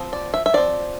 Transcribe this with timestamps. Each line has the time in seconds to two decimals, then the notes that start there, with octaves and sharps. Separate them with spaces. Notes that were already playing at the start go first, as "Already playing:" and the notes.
Already playing: F3 C4
0.13 D5
0.34 E5
0.46 E5
0.53 F3 C4 D5